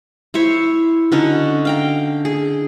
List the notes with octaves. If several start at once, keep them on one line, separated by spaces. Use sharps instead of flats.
E4 C5 C#5 E5
D3 C#4 D#4 F#4
F5 G5 A#5
G#4